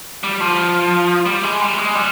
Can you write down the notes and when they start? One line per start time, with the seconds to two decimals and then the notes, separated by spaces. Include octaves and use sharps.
0.24 G3
0.40 F3
1.26 G3
1.43 G#3
1.61 G3
1.78 G#3
1.95 G3